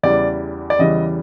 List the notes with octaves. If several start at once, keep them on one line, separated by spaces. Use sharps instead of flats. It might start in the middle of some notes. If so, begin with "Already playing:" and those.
E2 C#3 E3 G3 D5
D5
E2 C#3 E3 G3 D#5